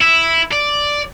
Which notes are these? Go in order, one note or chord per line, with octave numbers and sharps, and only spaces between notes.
E4
D5